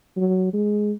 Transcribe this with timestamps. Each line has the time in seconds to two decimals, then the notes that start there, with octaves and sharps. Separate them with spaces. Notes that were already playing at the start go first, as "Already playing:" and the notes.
0.17 F#3
0.54 G#3